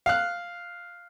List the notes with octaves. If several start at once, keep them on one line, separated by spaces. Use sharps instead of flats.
F5 F#6